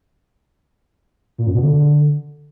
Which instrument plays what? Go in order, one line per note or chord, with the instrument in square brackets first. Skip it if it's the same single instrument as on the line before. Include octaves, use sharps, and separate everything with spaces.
[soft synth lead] A#2
F#2
B2
D3